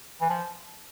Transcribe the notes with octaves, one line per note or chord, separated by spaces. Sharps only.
E3
F3